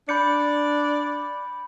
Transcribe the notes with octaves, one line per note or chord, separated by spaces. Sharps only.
D4 D5 B5 G6 C#7